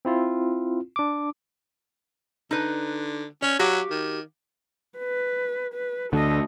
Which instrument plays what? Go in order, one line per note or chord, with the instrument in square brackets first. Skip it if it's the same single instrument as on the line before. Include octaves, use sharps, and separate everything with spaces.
[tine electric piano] C4 E4 F4
D4 D6
[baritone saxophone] D3 [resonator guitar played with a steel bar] D#4 B4
[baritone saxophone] C#4 [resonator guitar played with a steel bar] C#5
[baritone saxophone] F#3 [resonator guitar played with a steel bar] F#4 G4 F5
[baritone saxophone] D#3
[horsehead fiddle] B4
B4
[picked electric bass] D2 D3 [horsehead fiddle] A4 D#5